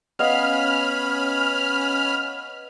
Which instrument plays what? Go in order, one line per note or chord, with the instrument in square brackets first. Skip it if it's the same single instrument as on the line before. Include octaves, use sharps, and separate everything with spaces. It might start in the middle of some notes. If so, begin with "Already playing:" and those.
[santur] B3 D#5 F5 [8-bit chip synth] C#4 B5 [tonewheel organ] F6